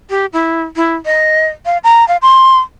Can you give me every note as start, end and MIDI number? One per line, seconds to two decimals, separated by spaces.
0.10 0.26 67
0.33 0.63 64
0.76 0.94 64
1.05 1.47 75
1.66 1.78 77
1.84 2.06 82
2.08 2.17 77
2.22 2.58 84